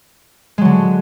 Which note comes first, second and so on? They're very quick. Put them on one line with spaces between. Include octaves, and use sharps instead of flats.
G#3 F#3 D3